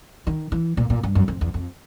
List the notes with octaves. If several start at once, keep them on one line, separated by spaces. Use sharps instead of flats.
D#3
E3
A#2
A#2
G2
F#2
F2
E2
F2